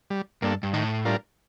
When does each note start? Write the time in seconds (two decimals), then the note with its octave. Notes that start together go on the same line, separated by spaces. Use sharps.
0.10 G3
0.42 G2 A#3 D4 A4
0.63 G2
0.73 A2 D#3
1.05 G3 D4 F4 A#4